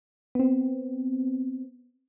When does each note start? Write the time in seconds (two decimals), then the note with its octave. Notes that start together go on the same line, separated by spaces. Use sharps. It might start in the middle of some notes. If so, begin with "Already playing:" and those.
0.35 B3 C4